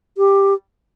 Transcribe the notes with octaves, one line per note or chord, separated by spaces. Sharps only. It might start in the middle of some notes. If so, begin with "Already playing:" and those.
G4